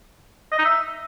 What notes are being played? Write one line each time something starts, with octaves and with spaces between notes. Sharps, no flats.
D#5
D#4
E5